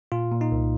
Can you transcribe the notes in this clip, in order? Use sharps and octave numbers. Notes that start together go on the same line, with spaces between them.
A#2 F4
A#2
D#4
C2